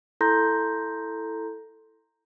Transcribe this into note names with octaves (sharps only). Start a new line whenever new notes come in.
E4 A4 A#5 C6 G6 A#6